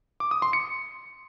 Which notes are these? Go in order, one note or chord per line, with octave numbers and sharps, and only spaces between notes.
D6
D#6
C6
C#7